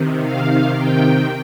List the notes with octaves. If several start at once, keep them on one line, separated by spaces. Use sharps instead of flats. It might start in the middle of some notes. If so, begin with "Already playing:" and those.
Already playing: C3 D#3
F5
G5